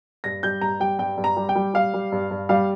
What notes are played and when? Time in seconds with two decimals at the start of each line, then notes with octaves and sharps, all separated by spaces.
0.24 G2 A#6
0.43 G3 G6
0.61 G2 A#5
0.80 G3 G5
0.99 G2 G5
1.17 G2
1.24 A#5
1.37 G3
1.49 G5
1.55 G3
1.74 G3 F5
1.94 G3
2.12 G2
2.31 G2
2.49 G3 F5